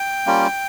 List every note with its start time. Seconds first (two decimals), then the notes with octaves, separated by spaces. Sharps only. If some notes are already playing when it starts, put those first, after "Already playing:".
Already playing: G5
0.26 G3 A#3 C#4 F4